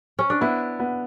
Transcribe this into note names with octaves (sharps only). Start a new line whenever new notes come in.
C#4
D4
B3 E4
B3